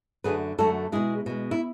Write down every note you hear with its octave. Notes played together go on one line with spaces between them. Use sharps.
F#2 D3 F#3 A3 G#4 B4
F#2 D3 F#3 A3 F#4 A4
B2 G#3 E4 G#4
B2 G#3
E4